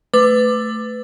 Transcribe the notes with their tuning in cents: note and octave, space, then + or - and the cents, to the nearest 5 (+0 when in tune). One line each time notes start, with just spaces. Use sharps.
A3 +0 B4 +20 D6 +15